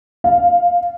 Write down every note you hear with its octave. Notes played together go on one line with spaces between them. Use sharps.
F5